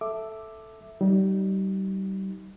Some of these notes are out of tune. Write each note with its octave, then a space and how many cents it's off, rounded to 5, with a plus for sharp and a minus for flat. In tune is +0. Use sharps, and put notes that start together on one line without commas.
A4 +0 E5 +0 D6 +5
G3 -30 D#4 +0